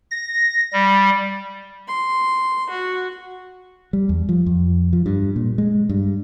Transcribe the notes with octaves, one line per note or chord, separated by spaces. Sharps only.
A#6
G3
C6
F#4
G3
E2
F3
F2
F3
G2
A#2
G#3
G2